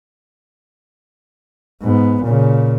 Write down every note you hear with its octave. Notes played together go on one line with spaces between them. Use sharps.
G#2 B3
A#2 C#3